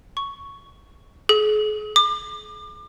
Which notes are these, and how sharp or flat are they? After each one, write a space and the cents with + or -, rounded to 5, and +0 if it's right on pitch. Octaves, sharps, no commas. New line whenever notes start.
C#6 +5
G#4 +40
D6 +35